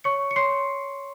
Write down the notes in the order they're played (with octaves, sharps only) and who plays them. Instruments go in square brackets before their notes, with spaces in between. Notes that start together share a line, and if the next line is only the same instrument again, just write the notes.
[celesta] C#5 C#6 C#7
C#7
C#5 C6 C7